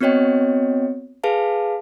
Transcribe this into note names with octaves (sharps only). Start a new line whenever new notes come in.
B3 C4 F#4 C#5 D#5 G5
G#4 B4 F5 A5